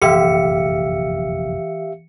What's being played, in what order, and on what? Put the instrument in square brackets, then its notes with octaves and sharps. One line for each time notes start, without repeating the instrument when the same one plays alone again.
[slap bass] F1 A#1 F#2 [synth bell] E3 C#7 [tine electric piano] G4 E5 F5